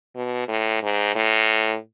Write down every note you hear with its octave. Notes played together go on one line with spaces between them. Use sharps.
B2
A2
G#2
A2